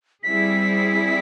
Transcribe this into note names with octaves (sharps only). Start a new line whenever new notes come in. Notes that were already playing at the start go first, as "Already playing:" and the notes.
G3 C4 E4 G#4 B6